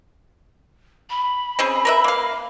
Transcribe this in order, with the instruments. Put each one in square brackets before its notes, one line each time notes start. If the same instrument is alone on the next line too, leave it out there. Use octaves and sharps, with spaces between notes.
[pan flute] B5
[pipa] C4 C#4 G#4
A#4 B4 E5
A#3 F5